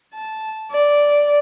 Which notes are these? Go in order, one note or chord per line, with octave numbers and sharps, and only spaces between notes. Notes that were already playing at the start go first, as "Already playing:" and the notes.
A5
D5